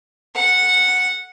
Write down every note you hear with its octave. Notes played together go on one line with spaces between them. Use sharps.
F#5